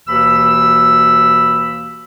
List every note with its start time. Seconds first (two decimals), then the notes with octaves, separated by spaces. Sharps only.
0.08 D#2 B2 E3 B5 E6